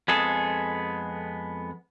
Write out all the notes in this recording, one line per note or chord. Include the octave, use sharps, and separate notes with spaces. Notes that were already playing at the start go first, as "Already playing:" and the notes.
F2 G#3 B3 G#4 A4